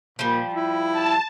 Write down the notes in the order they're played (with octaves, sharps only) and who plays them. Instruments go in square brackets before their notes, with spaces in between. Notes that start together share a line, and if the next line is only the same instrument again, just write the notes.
[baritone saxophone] A#2 [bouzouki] F3 G3
[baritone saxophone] E4
[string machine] A5